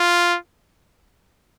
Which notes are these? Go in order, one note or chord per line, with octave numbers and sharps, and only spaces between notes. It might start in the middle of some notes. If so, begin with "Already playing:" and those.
Already playing: F4